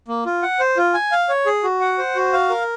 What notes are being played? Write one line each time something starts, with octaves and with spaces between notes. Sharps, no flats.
A#3
F4
F#5
C5
F4
G#5
F5
C#5
G#4
F#4
F#5
C5
F#4
F5
A#4